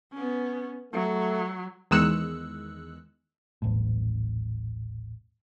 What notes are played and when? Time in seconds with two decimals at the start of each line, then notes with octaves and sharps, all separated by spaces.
0.12 B3 C#4
0.93 F#3 A3
1.91 E2 D#3 G#3 E6 F#6 C#7
3.62 D#1 A1 F#2 A2